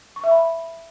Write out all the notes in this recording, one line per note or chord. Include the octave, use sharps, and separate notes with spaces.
C#6
E5
B5